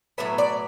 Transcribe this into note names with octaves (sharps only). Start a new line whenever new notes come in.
A2 F#3 B3 E5
D5